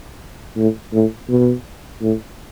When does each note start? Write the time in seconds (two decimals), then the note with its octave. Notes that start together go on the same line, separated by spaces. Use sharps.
0.57 A2
0.93 A2
1.29 B2
2.02 A2